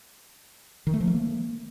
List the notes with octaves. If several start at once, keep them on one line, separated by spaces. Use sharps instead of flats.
D#3
A3
F3
A3
A#3